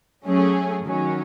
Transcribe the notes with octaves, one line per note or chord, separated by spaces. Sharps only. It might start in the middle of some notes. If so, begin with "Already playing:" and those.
F#3 A3 C#4 G#4
D#3 F#3 C#4